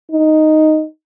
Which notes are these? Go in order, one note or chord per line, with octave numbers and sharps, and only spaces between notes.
D#4